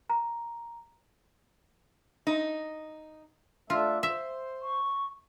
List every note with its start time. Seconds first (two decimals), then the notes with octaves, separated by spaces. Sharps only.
0.10 A#5
2.27 D#4
3.70 A3 D4 F4 E5
4.03 C5 E5
4.62 C#6